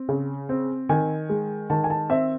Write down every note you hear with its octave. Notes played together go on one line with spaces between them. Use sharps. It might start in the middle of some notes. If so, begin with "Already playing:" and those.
Already playing: C4
C#3
C4
D#3 G#5
G#3
D#3 A5
G#5
A5
C4 E5